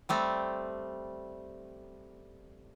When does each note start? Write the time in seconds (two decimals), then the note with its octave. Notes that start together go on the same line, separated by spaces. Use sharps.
0.09 G3 A3 C4